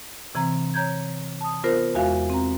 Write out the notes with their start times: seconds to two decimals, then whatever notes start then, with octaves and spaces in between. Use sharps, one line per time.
0.35 C3 E3 C4 A#5
0.74 C#5 A#5 G6 G#6
1.41 A5 D#6
1.64 B3 F4 A#4 C5
1.95 E2 G#3 F#4 E5 F5 G#5
2.30 C4 A#5